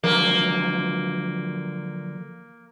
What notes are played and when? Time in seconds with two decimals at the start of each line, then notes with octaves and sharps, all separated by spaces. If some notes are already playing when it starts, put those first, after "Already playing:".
0.04 D3 F3 F#3 A#3